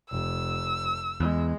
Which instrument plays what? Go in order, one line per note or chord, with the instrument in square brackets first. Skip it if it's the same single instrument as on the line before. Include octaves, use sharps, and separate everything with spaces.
[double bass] F1 [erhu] E6
[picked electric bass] E2 [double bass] G#3